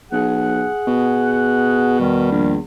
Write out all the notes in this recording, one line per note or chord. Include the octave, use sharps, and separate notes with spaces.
B1 G#4 F#5
B2
E2 D#3 G3
A#1